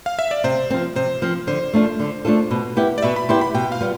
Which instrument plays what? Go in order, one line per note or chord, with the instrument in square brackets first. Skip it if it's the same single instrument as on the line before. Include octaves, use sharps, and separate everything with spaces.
[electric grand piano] F5
E5
D5
[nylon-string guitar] C3 [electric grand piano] C5
[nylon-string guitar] F3 C4
[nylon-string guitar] C3 [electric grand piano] C5
[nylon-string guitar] F3 C4
[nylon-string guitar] D3 [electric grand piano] C5
[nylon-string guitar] A3 D4 F4 A4
D3
A3 D4 F4 A4
B2
B3 E4 G4
[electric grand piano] D5
[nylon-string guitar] B2 [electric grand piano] E5
[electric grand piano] B5
[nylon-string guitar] B3 E4 G4 [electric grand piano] C6
[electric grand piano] B5
[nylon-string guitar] B2 [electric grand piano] G5
[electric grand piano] F5
[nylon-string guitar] G3 B3 F4